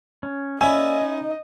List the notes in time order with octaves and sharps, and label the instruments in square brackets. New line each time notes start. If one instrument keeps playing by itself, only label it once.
[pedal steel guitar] C#4
[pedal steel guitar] A#3 D5 E6 [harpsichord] C#4 E4 [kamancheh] D#5 [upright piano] G#5
[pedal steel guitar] D#4